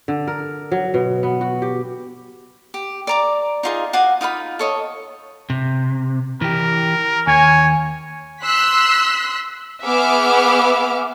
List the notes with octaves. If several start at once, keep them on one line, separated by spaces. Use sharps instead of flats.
D3
A#4
F#3
B2
B3
F#4
G4
G4
D5 A#5 D6
D#4 F4 G#4
F#4 F5 G#5 D6
D#4 F4 F5 B5
A4 C#5 D#5
C3
E3 G4 A#4
D#2 C#5 G#5
C6 E6 F#6 B6
B3 G#4 E5 D6 F6